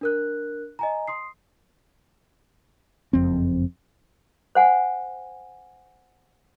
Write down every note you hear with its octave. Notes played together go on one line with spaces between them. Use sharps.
D4 A#4 F#6
D#5 G#5 A#5
C6 D#6 C7
F#1 F2 C4
C5 F#5 G#5